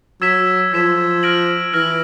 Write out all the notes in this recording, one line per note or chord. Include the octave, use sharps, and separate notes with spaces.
F#3 E6 G#6 B6 E7
F3 E6 G#6 B6 E7
F6 A#6 D7 F#7
E3 F6 A#6 D7 F#7